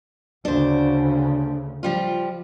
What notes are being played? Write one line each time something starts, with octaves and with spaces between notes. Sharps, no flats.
D2 C#3 D4 C5
F3 G3 F4